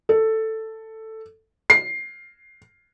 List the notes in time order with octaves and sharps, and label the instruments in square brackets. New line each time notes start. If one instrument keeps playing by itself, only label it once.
[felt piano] A4
C7